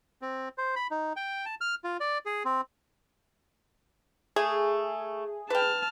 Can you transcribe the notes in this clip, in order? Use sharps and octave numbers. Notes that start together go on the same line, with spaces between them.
C4
C5
B5
D#4
G5
A5
F6
F4
D5
G#4
C4
A3 G#4
B4 G5 A5 F6